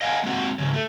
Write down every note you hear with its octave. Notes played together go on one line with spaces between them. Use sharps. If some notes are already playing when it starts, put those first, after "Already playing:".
D#5 F5 F#5 G#5
G#3 A#3 C4 F#4 F#5
G#2 C#3 F#3
A3